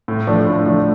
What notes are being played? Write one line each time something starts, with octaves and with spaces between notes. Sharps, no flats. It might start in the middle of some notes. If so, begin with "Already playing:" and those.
A2
F3 A3 D4
A2
F3 A3 D4